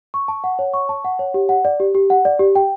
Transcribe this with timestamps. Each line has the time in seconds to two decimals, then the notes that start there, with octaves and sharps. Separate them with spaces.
0.14 C#6
0.28 A5
0.44 F#5
0.59 C#5
0.74 C#6
0.89 A5
1.05 F#5
1.19 C#5
1.34 G4
1.49 F#5
1.65 D5
1.80 G4
1.95 G4
2.10 F#5
2.25 D5
2.39 G4
2.55 G5